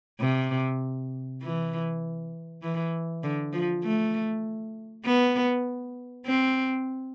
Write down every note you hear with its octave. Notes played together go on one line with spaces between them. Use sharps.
C3
E3
E3
D3
F3
A3
B3
C4